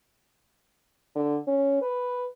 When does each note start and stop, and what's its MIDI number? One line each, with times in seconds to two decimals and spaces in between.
1.15 1.38 50
1.47 1.77 61
1.82 2.25 71